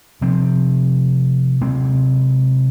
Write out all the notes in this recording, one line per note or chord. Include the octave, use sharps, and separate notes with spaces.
C3 F3 C4
C3 G#3 C4